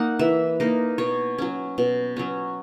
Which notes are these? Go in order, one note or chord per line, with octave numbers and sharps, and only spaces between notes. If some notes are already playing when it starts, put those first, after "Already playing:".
Already playing: A#3 D#4 F#5
E3 E5
A#3 D#4
B2 C#5
F#3 C#4
B2
F#3 C#4